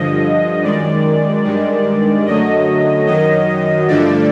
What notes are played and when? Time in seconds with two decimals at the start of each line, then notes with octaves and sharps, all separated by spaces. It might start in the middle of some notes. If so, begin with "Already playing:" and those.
Already playing: G2 D3 F3 D#5
0.63 F#2 D#3 G#3 D5
1.44 G2 D#3 G#3
2.25 F#2 D3 F#3 A3 D#5
3.07 F#2 D#3 F#3 D#5
3.87 G2 D3 F3 A3 D5